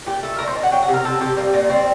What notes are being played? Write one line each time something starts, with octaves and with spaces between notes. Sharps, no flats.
A#2 G4
A3 A4
A#2 A#4
C5
A#2 D#5
F#5
F#3 G5
F#5
C3
A#4
C3 A4
C3 G4
G3 A#3
A#2 A#3
G3 C4